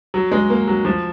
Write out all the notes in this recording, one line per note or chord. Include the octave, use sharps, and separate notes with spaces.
F#3
G#3
A#3
F#3
F3